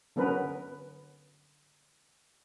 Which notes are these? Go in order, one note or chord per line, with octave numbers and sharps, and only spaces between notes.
D3 F#3 B3 C#4 A#4 B4